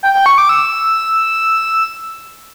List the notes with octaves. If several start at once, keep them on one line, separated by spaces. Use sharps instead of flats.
G5
G5
C#6
D6
E6